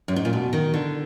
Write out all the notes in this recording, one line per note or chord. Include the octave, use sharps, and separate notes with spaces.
F#2
G#2
A#2
B2
D#3
D3